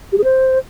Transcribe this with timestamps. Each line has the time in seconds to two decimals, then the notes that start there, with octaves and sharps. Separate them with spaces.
0.12 G4
0.18 G#4
0.24 C5